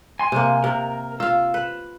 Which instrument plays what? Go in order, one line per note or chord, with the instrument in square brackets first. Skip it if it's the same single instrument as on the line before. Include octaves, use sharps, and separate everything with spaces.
[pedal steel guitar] G#5 C6
[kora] C3 A#3
[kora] C3 [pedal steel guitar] A#4
[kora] F4 F5 [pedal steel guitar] E6
[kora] B4